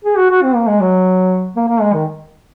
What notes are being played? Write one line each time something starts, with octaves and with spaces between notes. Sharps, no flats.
G#4
F#4
F#4
C4
A#3
G#3
F#3
A#3
A#3
G#3
D#3